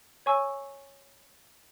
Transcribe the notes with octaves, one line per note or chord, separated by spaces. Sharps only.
C#5 G#5 C#6 E6